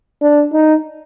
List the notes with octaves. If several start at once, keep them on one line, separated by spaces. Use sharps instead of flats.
D4
D#4